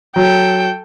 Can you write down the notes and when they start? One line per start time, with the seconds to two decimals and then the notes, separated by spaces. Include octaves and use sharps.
0.16 F#3 A4 G5